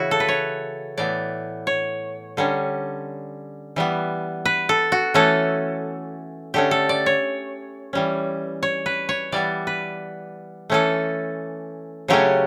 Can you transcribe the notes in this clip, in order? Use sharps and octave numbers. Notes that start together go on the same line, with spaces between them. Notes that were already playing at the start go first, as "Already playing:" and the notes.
Already playing: C#3 E3 C#4 E4 F#4
A4
B4
C#5
A2 E3 B3 D5
C#5
D3 G3 C#4
E3 G3 B3
B4
A4
F#4
E3 A3 C#4 A4
D3 A3 C#4 G4
A4
D5
C#5
E3 G3 C#4
C#5
B4
C#5
E3 G3 B3 D5
B4
E3 A3 C#4 A4
C#3 F#3 A3 C#4 G4